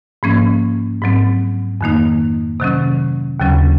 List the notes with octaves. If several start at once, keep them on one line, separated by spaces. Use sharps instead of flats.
G#2 F3 A#3 C#4
G#2 F#3 C4
F2 D#3 A#3 D#4
C3 D#3 F#3 C#4
D#2 C#3 F#3 C#4